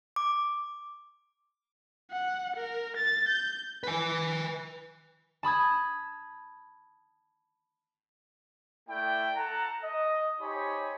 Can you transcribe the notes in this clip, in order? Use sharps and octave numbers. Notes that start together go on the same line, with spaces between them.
D6
F#5
A#4
A6
G6
B4 G#5
A5 B5 D#6 G#6
A3 E4 D5 G5
A4 F#5 A5 A#5
D#5
D#4 G4 C5 C#5 G#5 B5